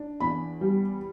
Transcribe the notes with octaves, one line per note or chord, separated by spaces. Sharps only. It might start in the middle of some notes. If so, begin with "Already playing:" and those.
Already playing: D4
E2 B5
G3